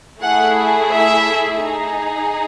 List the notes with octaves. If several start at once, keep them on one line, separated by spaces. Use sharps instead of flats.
A3 E4 G#4 F#5
E5
D#4 G#4